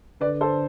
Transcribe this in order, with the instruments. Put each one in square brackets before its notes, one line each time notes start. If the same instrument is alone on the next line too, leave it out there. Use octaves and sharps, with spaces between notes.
[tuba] D3 [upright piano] B4 D5
[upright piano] A4 C5